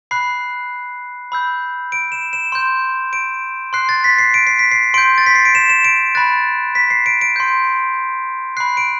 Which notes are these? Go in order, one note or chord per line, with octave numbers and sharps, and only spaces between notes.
B5 F#6 C7
B5 E6 G6
D7
E7
E7
C6 G6
D7
C6 F#6 C7
A6
B6
C7
D7
C7
B6
C7
C6 G6 D7
A6
B6
C7
D7
E7
E7
D7
B5 F#6 A6
B6
C7
D7
D7
C6 G6
B5 F#6 C7
D7